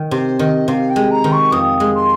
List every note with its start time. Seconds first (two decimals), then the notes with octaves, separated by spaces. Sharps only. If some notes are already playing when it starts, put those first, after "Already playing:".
Already playing: D#3
0.11 C3 C5
0.39 D#3 D#5
0.67 C3 F5
0.90 G5
0.96 G#3
1.11 A#5
1.24 D#3
1.32 C#6
1.52 F2 D#6
1.80 G#3
1.94 C6